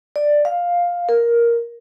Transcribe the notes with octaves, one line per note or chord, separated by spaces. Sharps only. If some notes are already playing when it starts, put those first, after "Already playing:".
D5
F5
A#4